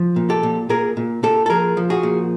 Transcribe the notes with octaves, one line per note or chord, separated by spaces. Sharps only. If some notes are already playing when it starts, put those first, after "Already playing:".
Already playing: F3
A#2
G4 A4
A#2
A#2 G#4 A#4
A#2
A#2 G4 A4
A4
F3 G#4 A#4
F3
F#4 G#4
A#2